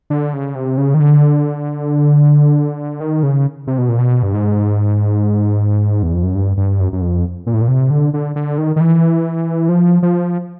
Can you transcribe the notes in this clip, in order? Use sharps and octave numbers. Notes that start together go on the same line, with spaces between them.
D3
C#3
C3
C#3
D#3
D3
D#3
C#3
C3
B2
A#2
B2
G2
G#2
E2
F2
F#2
G2
G2
F#2
F#2
F2
A#2
A2
A#2
C3
D3
D3
D3
D#3
D#3
E3
F3
F3